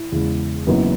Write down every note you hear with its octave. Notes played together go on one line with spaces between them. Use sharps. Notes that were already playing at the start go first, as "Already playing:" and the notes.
Already playing: E4
E2 C#3 G#3
F#1 F#2 E3 B3 D#4